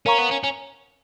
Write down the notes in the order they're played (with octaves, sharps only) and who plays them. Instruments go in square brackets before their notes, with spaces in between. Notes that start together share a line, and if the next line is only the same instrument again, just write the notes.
[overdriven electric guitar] C#4 [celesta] A#4 F5 A#5 C#6
[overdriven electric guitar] B3
C#4
C#4